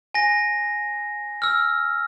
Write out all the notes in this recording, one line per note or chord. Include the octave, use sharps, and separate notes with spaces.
G#5 A#6
E6 F6